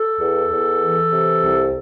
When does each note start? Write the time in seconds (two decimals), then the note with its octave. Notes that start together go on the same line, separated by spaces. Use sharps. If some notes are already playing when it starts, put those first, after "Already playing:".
Already playing: A4
0.18 E2
0.49 E2
0.80 E3
1.11 C3
1.42 C2